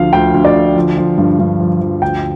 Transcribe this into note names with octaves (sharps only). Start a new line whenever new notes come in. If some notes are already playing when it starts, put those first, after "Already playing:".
Already playing: D2 D3 F3 F5
D2 G5
D2
D5
D3
F3
F3
G2
G2
F3
F3
D2 G5